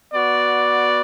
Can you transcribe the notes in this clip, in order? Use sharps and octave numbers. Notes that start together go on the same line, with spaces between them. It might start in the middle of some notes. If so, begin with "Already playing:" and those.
B3 F#4 D5